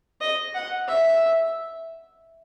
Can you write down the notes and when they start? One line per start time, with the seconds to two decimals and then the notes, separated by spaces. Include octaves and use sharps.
0.21 D#5
0.55 F#5
0.88 E5